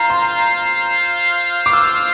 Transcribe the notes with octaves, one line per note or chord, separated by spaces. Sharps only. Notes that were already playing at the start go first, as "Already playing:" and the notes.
Already playing: F4 C5 F5 A#5
C6
D6
E6